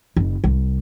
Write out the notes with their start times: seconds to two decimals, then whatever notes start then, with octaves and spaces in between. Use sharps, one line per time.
0.17 F#1
0.44 C2